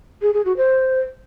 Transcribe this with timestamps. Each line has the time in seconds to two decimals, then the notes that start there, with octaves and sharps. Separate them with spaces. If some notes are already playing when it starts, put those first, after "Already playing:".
0.22 G#4
0.34 G#4
0.45 F#4
0.57 C5